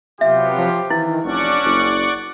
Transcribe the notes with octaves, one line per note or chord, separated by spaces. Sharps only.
C3 F#3 B3 F4 G4 E5
F3
D#3 E3 E4
F1 C#4 D4 D5 F#5 C#6
F#1